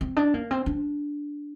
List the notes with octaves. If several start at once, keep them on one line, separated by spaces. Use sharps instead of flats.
C4
D4
A#3
C4
D4